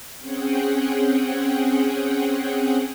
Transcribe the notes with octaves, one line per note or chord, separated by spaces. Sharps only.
C4 C#4 G#4 F#5 G5